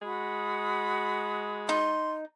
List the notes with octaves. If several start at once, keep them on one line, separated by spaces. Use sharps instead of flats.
G#3 F#4 B5 D#6
D#4 C6